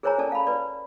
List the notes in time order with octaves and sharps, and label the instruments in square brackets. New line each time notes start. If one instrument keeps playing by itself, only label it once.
[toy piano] G#4 A#4 C5 C#5 G#5 A#5
C#4 A4 D5 A5
F5 B5
B4 D5